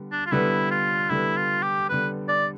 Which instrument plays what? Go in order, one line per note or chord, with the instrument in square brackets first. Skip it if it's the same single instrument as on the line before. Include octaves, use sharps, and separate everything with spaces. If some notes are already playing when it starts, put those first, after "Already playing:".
Already playing: [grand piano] D3 G3 B3
[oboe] D4
F4
[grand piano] D3 G3 B3 [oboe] E4
[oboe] F4
[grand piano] D3 G3 B3 [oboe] E4
[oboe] F4
G4
[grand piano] D3 G3 B3 [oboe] B4
[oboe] D5